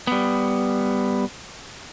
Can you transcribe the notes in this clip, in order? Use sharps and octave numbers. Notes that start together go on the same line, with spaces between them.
G3 B3